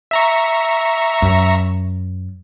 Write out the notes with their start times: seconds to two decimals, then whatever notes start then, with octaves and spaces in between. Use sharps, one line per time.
0.11 E5 A#5 C#6
1.22 F#2